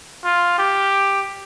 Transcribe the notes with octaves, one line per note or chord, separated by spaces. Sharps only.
F4
G4